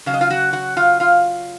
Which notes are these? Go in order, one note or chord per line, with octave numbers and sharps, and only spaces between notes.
C#3 F#3 F5
D#5
F4 F5
F#4 F#5
F#4 F#5
F4 F5
F4 F5